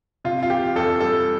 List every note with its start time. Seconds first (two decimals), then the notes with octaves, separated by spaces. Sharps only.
0.24 C3 F4
0.43 F4
0.50 E3 G4
0.75 F2 A4
1.00 G3 A4